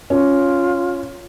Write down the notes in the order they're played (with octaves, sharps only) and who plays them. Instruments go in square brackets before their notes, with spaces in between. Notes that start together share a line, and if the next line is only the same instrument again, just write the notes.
[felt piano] C#4 [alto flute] F4